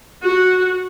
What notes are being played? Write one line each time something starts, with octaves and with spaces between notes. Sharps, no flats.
F#4